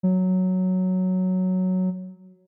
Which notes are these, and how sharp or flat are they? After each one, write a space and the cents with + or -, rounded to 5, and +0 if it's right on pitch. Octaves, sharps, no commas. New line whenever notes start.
F#3 +0